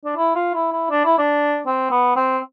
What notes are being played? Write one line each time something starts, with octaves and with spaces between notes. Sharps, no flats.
D4
E4
F4
E4
E4
D4
E4
D4
C4
B3
C4